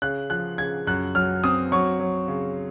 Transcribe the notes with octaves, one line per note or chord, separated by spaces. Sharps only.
C#3 F#6
F3 F#6
C#3 G#6
F#2 F#6
F#3 F6
C4 D#6
F#3 C#6
F#3
C#3